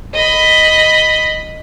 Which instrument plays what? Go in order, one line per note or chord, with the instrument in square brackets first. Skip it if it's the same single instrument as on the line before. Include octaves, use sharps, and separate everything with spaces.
[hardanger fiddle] D#5 B5